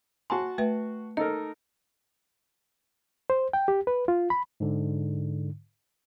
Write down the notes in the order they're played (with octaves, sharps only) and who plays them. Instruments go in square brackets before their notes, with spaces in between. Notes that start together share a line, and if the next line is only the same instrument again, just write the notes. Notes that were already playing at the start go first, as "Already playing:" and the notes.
[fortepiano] F#4 A5 C6 [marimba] G#5
[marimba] A3 B4 E5
[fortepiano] D#4 A4 A#4 [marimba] D#5
[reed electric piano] C5
G5
G4
B4
F4
B5
[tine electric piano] G#2 D3